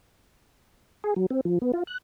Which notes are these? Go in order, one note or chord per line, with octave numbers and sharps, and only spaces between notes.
G#4
F#3
C4
F3
B3
F4
F#6